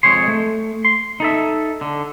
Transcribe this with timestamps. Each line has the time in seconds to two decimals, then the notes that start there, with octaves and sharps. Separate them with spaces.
0.03 F2 G#3 C#5 C6
0.28 A3
0.85 C6
1.20 D#4 A4 E5
1.81 D3